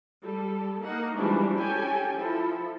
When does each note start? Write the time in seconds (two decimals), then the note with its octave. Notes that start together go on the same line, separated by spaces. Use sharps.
0.23 G3 A4
0.83 A#3 D#4 F#5
1.15 E3 F3 G3 G#3 D4 F#4
1.58 C#4 G4 A4 G5 G#5
2.15 F3 E4 F4 A4